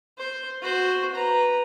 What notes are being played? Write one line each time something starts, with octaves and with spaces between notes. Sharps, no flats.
C5
F#4 C5
B4 A#5